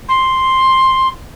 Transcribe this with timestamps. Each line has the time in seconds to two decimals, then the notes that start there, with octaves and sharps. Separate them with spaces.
0.08 C6